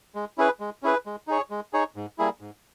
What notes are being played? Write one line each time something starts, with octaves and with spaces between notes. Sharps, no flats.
G#3
C#4 E4 G#4 B4
G#3
C#4 E4 G#4 B4
G#3
D#4 G#4 C#5
G#3
D#4 G#4 C#5
G#2
G3 A#3 E4 G#4
G#2